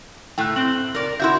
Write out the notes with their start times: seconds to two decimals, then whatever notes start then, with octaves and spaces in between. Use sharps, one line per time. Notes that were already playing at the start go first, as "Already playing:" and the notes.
0.38 A2 A3 G5 F#6
0.56 C4 F#7
0.95 A#4 D5
1.20 E4 F#4 E5 C6 G6